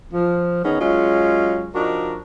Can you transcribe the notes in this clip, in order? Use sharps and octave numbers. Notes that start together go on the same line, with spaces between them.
F3
D#3 B3 C#4 D#4 G#4
F#3 G#3 C#4 F4 G#4
F3 D4 D#4 F#4 A#4